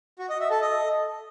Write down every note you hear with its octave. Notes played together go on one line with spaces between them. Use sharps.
F#4
D#5
E5
A4
D#5